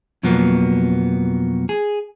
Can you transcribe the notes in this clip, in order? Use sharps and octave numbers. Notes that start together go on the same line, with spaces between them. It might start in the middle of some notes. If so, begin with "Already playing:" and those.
F2 B2 F3 F#3 A#3 B3
G#4